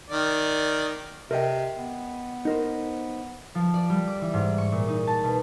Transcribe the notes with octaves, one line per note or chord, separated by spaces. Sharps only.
D#3 D5
C3 A#4 D#5 G5
B3
D#4 A#4 C5
F3
D5
G3
D6
E3
G#2
C#6
A#2
D#4
A5
B2